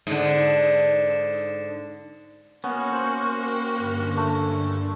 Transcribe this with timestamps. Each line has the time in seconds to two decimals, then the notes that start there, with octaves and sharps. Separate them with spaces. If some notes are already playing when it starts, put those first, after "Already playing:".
0.07 G#2 D3
2.64 A#3 B3 C#4 F#4 F#6 C#7
2.92 C5 C6
3.34 G5 B5
3.78 G2 D3
4.17 A3